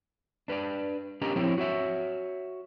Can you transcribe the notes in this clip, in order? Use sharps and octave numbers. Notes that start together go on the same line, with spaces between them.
D4 B4 C#5 D5
C#4 D4 G4 A#4 D#5 A#5
F3 C4 E4 C#5
F#4 C#5 E5